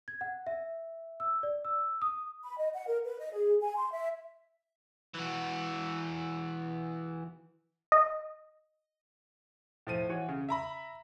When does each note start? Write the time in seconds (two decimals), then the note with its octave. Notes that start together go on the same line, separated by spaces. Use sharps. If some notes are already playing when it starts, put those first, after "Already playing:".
0.08 G#6
0.21 F#5
0.47 E5
1.20 E6
1.43 D5
1.65 E6
2.02 D#6
2.43 B5
2.58 D#5
2.74 F#5
2.87 A#4
3.05 B4
3.19 D#5
3.32 G#4
3.61 G#5
3.77 C6
3.92 E5
5.15 E3 F#4
7.92 D#5
9.87 A2 F3 D#7
10.09 E3 F#4 C#5
10.29 C#3
10.49 E5 A#5 B5